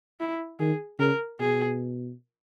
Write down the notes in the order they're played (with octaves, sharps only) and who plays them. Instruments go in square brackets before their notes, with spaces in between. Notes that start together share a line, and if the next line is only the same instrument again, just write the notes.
[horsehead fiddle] E4
[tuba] D#3 [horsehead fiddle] G#4
[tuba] C#3 [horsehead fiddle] A#4
[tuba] B2 [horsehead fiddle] G#4